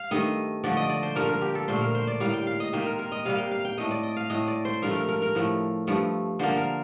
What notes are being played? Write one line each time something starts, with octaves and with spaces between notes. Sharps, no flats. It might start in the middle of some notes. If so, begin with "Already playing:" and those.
Already playing: F5
G2 D#3 A3 D#5
D3 F3 A3 D5
D#5
D5
C5
G2 F3 A#3 A#4
A#4
G4
A4
A#2 A3 C5
A#4
C5
D5
A2 G3 A#3 F5
G5
F5
D#5
C3 D#3 A#3 C5
A#4
A#4
D#5
C3 G3 A#3 F5
G5
F5
G5
A2 A3 D#5
D5
D#5
F5
A2 A3 D#5
D5
C5
G2 F3 A3 A#4
A#4
A#4
A#4
A2 F3 A3
G2 F3 A3
D3 F3 A#3 C5
A#4